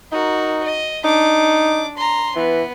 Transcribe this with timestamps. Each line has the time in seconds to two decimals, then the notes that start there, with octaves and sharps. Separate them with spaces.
0.12 D#4 F#4 A#4
0.64 D#5
1.04 D4 D#4 D6
1.97 A#5 C6
2.36 E3 B3